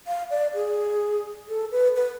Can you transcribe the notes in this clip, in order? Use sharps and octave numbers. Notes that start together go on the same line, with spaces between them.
F5
D5
G#4
A4
B4
B4